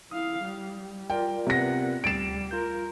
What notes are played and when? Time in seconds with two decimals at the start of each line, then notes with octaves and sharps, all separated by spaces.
0.11 E4 F5 D#6
0.43 G3
1.10 F4 A#4 D5 G5
1.47 C3 B3 F#5 A#6
2.04 D2 G3 A6 C7 D7 E7
2.51 F4 A#4 G6